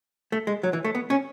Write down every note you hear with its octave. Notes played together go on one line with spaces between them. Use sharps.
A3
G#3
F#3
E3
A3
B3
C#4